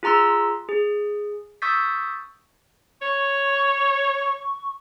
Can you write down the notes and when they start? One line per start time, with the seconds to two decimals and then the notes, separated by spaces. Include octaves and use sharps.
0.03 F4 G#4 A#5 C6 E6
0.69 G#4
1.62 C#6 D#6 E6 G6 A6 B6
3.02 C#5 C#6